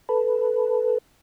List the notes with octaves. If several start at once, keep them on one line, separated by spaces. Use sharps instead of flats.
A4 B4